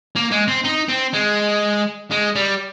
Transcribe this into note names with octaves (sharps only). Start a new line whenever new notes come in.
A#3
G#3
C4
D#4
C4
G#3
G#3
G3